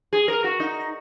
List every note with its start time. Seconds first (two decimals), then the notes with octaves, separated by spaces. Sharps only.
0.13 G#4
0.28 A#4
0.44 F#4
0.60 D#4